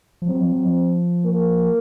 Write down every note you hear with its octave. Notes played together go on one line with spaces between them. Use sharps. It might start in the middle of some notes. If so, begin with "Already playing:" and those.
F3
F#3 C4
F3
F#3
F3
A#3